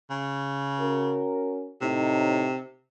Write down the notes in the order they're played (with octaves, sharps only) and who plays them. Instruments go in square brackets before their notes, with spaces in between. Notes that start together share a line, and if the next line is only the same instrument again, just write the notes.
[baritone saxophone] C#3
[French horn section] C#4 F#4 A#4
[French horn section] A2 D#4 [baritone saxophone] C3